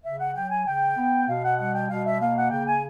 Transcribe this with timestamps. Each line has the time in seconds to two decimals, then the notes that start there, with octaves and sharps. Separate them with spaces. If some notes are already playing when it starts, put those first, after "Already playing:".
0.04 C#3 E5
0.19 F#5
0.35 F#3 G5
0.50 G#5
0.66 C#3 G5
0.97 B3
1.28 B2 F5
1.44 F#5
1.58 G3 F#5
1.74 G5
1.89 B2 F5
2.06 E5
2.21 A#3 F5
2.37 F#5
2.51 C#3 G5
2.67 G#5